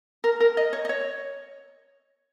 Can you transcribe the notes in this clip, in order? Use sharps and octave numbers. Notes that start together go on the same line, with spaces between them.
A#4
A#4
D#5
C#5
D#5
C#5